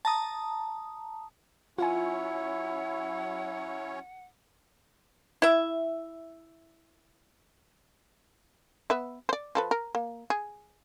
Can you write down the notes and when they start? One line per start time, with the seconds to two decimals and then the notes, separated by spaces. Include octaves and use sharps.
0.05 A5 A#5 D#6
1.78 F#3 C#4 E4 F4 C#5 F#5 G#5
5.42 E4 E5
8.90 B3 B4 E5
9.29 C5 D5
9.55 F3 A4 B4
9.71 A#4
9.95 A#3
10.30 G#4